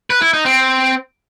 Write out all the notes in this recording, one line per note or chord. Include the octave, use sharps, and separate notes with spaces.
B4
E4
D#4
C4